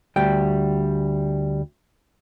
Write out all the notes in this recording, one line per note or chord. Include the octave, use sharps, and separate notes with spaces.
D2 G3 G5